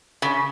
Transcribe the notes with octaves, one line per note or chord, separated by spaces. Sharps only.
C#3